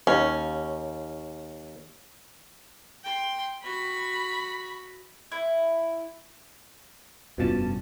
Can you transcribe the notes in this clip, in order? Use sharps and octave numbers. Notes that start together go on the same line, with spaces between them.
D#2 C#4
G5 C6
F#4 B5
E4
F1 G2 B2 F3 C#4 A5